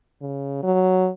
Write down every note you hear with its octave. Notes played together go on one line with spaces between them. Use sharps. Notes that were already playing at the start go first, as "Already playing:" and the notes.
C#3
F#3